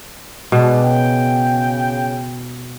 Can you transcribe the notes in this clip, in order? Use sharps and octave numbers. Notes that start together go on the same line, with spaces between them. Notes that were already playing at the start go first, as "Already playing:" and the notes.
B2 G#3 D4
C#3 G5